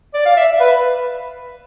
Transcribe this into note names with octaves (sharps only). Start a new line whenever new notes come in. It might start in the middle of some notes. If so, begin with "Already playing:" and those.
D5
F5
E5
B4